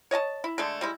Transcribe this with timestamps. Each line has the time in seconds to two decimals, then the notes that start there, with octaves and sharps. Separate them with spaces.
0.11 C#5 D#5 G#5 A5
0.44 E4
0.58 D3 G#3 A3 D4
0.81 G3 G#3 E4